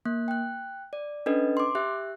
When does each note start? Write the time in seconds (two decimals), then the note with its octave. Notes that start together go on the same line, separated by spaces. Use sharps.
0.05 A#3 F#6
0.28 G5 F#6
0.93 D5
1.26 C#4 D4 A4 B4 D#5
1.57 C6 D6
1.75 G4 E5 F#6